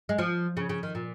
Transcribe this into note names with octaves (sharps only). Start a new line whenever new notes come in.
G#3
F3
C#3
C#3
D#3
A#2